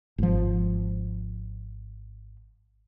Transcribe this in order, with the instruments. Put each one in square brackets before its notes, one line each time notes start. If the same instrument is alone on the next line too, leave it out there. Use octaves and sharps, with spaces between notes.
[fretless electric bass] G#1 F3